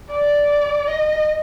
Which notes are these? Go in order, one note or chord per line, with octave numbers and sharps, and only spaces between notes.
D5
D#5